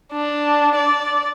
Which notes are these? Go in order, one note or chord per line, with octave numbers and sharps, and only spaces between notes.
D4
D5